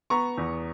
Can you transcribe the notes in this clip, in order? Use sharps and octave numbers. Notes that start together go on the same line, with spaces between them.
B3 A#5 C#6
E2